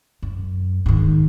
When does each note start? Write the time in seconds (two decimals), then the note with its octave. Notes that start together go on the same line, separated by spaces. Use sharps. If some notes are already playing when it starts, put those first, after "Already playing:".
0.22 F#2
0.86 G#2 D#3